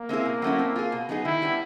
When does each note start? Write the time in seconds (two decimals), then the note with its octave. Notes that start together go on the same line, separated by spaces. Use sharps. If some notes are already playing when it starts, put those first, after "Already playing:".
Already playing: A#3
0.09 G#3 C4 E4 G#4
0.25 B2
0.42 F#3 A3 C#4 E4
0.59 C4
0.76 F4 G#4
0.92 B2
1.09 F#3 B3 D#4 G#4
1.25 D#3 E4
1.42 G3 B3 D4